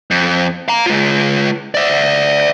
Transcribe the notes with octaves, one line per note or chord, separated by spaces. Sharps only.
F2
F5 A#5
G#3 F4
D5 E5